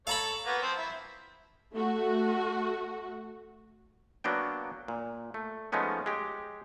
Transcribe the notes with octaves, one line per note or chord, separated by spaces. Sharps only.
A4 C#5 F5 A#5 B5
A#3 B3 F#4
F3 C4
E4
A3 F#4
F#3 A#3 B3 D4 G5
A#2
A3
F3 G#3 A3 B3 C#4 D#4
G#3 G4